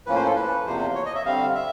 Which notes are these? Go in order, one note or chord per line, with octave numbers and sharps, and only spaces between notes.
A2 F3 A#3 C#4 B4
C5
A4
B4
E2 C3 F3 A#3 C5
C#5
D#5
E5
D3 G3 C4 F5
E5